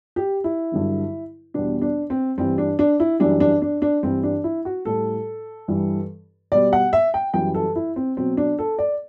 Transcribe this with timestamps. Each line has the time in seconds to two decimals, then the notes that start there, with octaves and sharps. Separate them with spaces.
0.16 G4
0.44 E4
0.72 G2 D3 F#3
1.54 E2 B2 G3 D4
1.82 D4
2.10 C4
2.38 G2 E3 G3 C4
2.58 D4
2.79 D4
3.00 E4
3.20 F#2 E3 G3 D4
3.40 D4
3.62 D4
3.82 D4
4.03 G2 E3 G3 C4
4.24 D4
4.44 E4
4.65 F#4
4.85 A2 G3 A4
5.68 G2 E3 G3
6.52 B2 G3 D5
6.73 F#5
6.93 E5
7.14 G5
7.34 F#2 E3 G3 G5
7.54 A4
7.76 E4
7.96 C4
8.17 B2 F#3 C4
8.37 D4
8.59 A4
8.79 D5